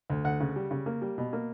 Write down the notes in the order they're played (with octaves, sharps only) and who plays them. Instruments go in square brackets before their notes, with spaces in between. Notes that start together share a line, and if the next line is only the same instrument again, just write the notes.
[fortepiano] D2
D2 F#5
C#3
G3
C#3
A#3
G3
B2
A#3